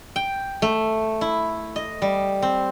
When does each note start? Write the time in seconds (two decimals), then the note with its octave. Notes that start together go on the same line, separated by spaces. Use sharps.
0.16 G5
0.62 A3
1.21 E4
1.76 D#5
2.02 G3
2.42 C4